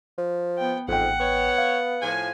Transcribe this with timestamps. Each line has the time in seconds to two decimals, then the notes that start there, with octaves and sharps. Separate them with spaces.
0.18 F3
0.58 B3 G5
0.88 A1 F2 G#2 F#5 G5
1.20 B3 C#5
1.58 F5
2.02 A2 F3 G#5